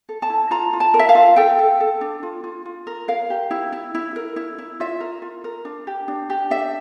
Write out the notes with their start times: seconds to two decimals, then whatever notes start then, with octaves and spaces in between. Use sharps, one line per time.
0.09 A4
0.22 A5
0.30 E4
0.51 F4 A#5
0.73 F4
0.80 A5
0.94 A#4
0.99 E5
1.09 F5
1.15 F4
1.36 A4 G5
1.59 A4
1.80 A4
2.01 D4
2.23 F4
2.44 F4
2.65 F4
2.87 A#4
3.08 A#4 F5
3.30 G4
3.51 E4
3.72 E4
3.95 E4
4.16 A#4
4.36 E4
4.58 E4
4.80 F4 E5
5.00 A#4
5.22 F4
5.44 A#4
5.65 D4
5.87 G4
6.08 D4
6.30 G4
6.50 D4 E5